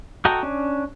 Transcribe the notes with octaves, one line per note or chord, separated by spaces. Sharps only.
F#4 A4 D#5 G5 A#5
C#4 D4